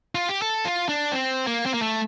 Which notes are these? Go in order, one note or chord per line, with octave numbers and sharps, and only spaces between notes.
F4
G4
A4
F4
D4
C4
A#3
C4
A#3
A3